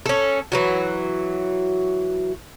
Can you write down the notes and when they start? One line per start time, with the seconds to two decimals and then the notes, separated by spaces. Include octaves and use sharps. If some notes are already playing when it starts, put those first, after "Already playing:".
0.06 C#4 A4
0.52 E3 F#3 F#4